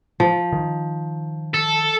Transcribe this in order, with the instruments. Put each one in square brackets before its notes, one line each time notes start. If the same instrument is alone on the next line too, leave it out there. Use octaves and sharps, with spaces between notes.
[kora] F3
[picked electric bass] D#3
[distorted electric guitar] A4